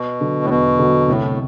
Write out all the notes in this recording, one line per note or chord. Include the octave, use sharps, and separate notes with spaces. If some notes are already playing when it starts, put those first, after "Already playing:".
Already playing: B2
D3 F#3
A2
E2 B2
D3 F#3
C2 A2